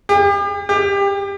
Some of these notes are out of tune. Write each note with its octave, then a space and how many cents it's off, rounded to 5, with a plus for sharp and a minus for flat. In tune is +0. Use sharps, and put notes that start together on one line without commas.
G4 +40
G4 +25